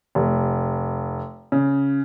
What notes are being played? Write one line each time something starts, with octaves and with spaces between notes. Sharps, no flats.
F1
C#3